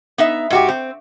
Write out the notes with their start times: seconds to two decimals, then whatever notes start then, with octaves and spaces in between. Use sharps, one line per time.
0.18 B3 D#4 E5
0.50 G#2 F#4 G4
0.69 C4